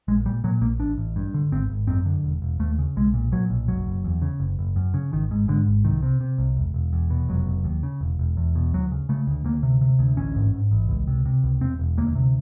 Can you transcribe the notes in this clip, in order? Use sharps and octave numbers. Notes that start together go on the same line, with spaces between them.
A#1 G#3
A#2 G3
A#2 F#3
A#1 A#3
A1 D4
A1
G2
D3
G#1 C4
G#1
F#2 C4
D3
E1
E1
D#2 A3
C#3
B1 G#3
A#2
A#2 F#3
B1
F#1 F#3
F#1
E2
C#3
F#1
F#1
F#2
C#3
G#1 D#3
G#2
G#2 D3
G#1
C2 D#3
C3
C3
C2
E1
E1
E2
B2
F1 F#3
F1
D#2
C#3
E1
E1
E2
B2
D2 F#3
C#3
C#3 A3
D2
D2 A#3
C3
C3
D2
A1 C#4
G#2
G#2
A1
C#2
C3
C3
C#2
E1 C4
E1
D2 A#3
C3